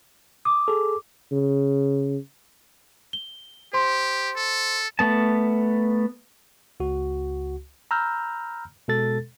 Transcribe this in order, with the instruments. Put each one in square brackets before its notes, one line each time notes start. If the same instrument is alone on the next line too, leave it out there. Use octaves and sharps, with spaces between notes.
[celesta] D6 [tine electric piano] D#6
[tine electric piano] G#4 A4
[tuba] C#3
[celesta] G7
[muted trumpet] G4 [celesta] C5 C6
[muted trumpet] A4
[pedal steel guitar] A3 B3 A5
[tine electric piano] C#2 F#4
A#5 B5 E6 F6 G6
B2 G#3 A4 A6